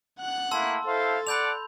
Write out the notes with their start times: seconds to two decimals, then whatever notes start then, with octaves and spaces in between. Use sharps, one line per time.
0.20 F#5 F#6
0.51 A3 A#3 E4 A5 C6 E6
0.86 E4 A4 C5 F5
1.27 D5 F#5 B5 D6 G6 F7